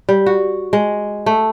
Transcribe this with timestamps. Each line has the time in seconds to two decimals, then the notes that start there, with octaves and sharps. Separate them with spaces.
0.09 G3
0.26 F#4
0.73 G#3
1.26 A3